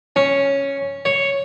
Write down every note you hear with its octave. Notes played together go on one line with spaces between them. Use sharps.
C#4
C#5